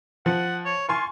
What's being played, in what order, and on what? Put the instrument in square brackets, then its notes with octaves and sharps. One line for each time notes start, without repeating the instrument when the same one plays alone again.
[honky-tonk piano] F3 [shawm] F#5
[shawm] C#5
[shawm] F4 [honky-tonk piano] G#5 C6 C#6